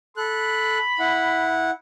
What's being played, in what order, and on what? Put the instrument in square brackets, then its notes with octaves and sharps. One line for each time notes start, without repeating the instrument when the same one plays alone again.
[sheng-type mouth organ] A4 F#6 [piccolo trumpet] B5
[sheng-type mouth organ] E4 F#5